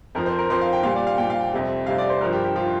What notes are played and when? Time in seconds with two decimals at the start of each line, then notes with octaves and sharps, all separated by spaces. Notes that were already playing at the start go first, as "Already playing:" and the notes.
0.15 F2 F3 A#4
0.26 C5
0.39 A#4
0.50 F2 F3 C5
0.61 F5
0.73 G5
0.83 A#2 G3 F5
0.95 D5
1.07 F5
1.18 A#2 G3 G5
1.30 F5
1.41 G5
1.52 F2 C3 G3
1.86 F2 C3 G3 F5
1.98 D5
2.09 C5
2.21 G2 F3 A#4
2.33 G4
2.44 G4
2.55 F3 F4